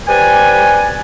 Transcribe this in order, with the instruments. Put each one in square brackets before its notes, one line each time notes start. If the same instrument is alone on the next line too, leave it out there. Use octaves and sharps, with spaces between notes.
[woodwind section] G4 B4 C5 D5 G#5